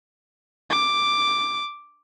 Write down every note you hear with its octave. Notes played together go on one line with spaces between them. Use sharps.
D6